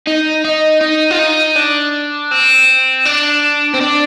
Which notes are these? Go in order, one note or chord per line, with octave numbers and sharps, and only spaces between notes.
D#4
D#4
D#4
F4
D#4
D4
C4
D4
C4
D4